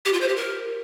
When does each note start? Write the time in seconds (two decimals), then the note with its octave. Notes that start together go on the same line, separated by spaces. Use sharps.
0.05 G4
0.13 F4
0.21 C5
0.29 G4
0.36 A#4